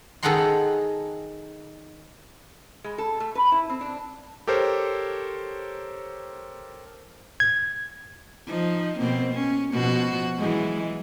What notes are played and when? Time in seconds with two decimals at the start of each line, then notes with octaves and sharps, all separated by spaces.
0.23 D#3 G#4 A4 F#5 A#5 C6
2.84 G#3
2.98 A4
3.20 A3
3.35 B4
3.52 E4
3.69 C4
3.81 D4
4.47 G4 A4 A#4 C5 C#5
7.40 G#6
8.47 F3 D#4
8.99 B2 A#3 C4
9.34 C#4
9.72 B2 F3 F#4
10.38 E3 F#3 G#3